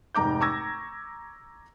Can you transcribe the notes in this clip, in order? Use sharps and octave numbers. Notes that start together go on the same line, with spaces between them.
F1 G#2 A#5 D6 G6
A#5 C#6 D6 E6 G#6 A#6